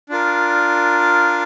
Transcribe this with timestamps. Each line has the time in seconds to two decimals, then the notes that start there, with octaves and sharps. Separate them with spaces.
0.09 D4 F4 A#4